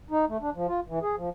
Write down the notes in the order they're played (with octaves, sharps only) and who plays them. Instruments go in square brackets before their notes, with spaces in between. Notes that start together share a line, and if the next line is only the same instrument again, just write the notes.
[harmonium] D#4
A3
D4
F3
F4
E3
G#4
F3